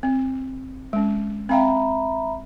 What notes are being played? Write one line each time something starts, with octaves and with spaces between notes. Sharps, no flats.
C4
G#3 C#4
C4 E5 F5 G5 A#5 B5